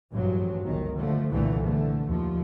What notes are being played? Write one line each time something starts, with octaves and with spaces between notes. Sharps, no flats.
A1 G2 F3 F#3
G1 C#2 D#3
D3 F3 A3
C2 F2 A#2 D3 E3 A3
D3 A3
D#2 F3